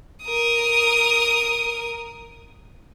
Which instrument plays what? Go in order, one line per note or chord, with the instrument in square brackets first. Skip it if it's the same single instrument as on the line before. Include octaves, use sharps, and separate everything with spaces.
[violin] A#4 D#6